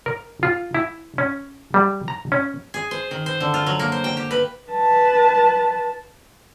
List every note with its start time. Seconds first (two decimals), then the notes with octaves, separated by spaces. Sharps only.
0.06 A#4
0.43 F4
0.75 E4
1.18 C#4
1.74 G3
2.08 A#5
2.32 C#4
2.74 G#4
2.91 C5
3.11 D#3
3.26 C5
3.40 D3
3.54 F4
3.66 F#3
3.79 A#3
3.92 C5
4.04 G5
4.17 G4
4.31 B4
4.71 B4 A5